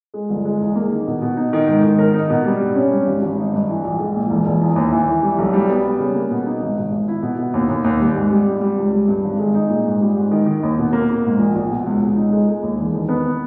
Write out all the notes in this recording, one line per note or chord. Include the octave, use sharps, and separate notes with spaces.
G#3
G1
G#3
E2
A#3
D#3
B2
B2
D#4
D#3
G#2
D#3
A#4
D#4
B2
G3
G2
C#4
G3
G#1
G#1
D#4
G2
E3
A#1
G#3
A#2
E1
E1
E2
D#2
E3
E3
G3
B1
G3
B3
G3
C#3
A#3
B2
D#4
G#1
G#2
G#1
E4
B2
B2
D#2
D#2
D#2
G3
G#2
G3
G3
G3
C#2
G3
G2
G#1
G#3
D#4
A#2
G#2
G3
G#2
D#3
D#3
D#2
B2
A#3
A#3
G#2
A#1
A#1
B2
C#2
C#2
D#4
G#3
G#3
D#2
E1
D#3
B3